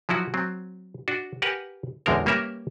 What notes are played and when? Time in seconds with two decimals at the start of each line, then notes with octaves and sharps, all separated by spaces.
0.09 F3 F#3 E4 F#4
0.34 F#3 C4
1.08 D4 F#4
1.42 G4 A#4 B4 F#5 G#5
2.06 A1 E2 D3 G#3 C4 A#4
2.26 G3 A#3 C#4 A#4 B4 E5